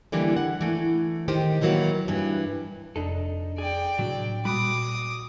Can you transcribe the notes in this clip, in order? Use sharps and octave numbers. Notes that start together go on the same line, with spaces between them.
D3 E3 G3 A#3
F#5
E3 A3
D#3 G4 C5
D#3 E3 F#3 A#3 F#4
G2 E3
F1 D4 D#4 A4
G#4 D5 G5
A2 C3 F#3 D4
A#2 G3 F#4 B5 D6 D#6